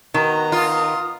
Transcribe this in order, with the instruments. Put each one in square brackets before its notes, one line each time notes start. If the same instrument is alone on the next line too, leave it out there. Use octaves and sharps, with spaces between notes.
[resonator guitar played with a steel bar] D#3 [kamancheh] B3 A#5 [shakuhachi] F#4
[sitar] F4 [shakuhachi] D#6